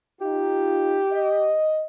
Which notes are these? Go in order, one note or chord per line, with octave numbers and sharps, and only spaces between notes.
D#4 F4 G4
D#5